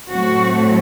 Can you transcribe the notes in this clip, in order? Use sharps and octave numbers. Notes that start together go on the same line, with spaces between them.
A2 F#3 A3 C4 F#4